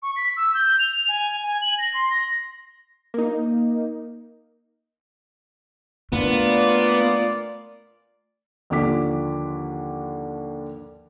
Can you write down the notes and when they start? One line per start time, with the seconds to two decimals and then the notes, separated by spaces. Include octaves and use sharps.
0.03 C#6
0.16 B6
0.37 E6
0.54 G6
0.79 F7
1.08 G#5
1.43 G#5
1.62 F#7
1.79 A#6
1.94 C6
2.10 A#6
3.14 A#3 D#4
6.13 A#2 A3 B3 D4 F4 D5
8.70 D#2 D3 F3 D6 B6